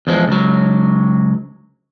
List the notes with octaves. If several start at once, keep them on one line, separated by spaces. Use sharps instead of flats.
E2 F3 G#3
C#2 F#3